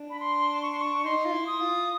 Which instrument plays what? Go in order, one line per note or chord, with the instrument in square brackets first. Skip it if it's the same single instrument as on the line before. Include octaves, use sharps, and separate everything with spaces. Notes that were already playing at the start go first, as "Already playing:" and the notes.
Already playing: [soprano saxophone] D4
[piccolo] B5
C6
C#6
C6
C#6
[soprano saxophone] D#4 [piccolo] C6
[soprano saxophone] F4
E4
[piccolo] D#6
[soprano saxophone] F4